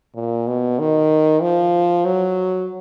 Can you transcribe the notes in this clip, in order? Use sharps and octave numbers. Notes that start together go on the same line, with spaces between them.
A#2
B2
D#3
F3
F#3